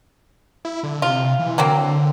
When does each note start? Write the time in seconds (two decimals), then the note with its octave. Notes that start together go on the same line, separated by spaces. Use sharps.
0.65 E4
0.83 D3
1.02 C3 F4
1.39 E3
1.58 D3 F#3 A#3 C4